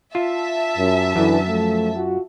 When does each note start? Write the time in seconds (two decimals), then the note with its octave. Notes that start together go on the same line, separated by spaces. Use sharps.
0.15 F4 E5 A5
0.77 F#2
1.16 F#2 D3 E3
1.48 F3 A3
1.95 F4 F#4